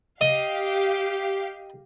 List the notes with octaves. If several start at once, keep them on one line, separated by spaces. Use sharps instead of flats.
G4 D#5 F5